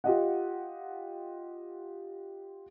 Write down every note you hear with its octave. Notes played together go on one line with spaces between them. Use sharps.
F4 G4 D#5 F#5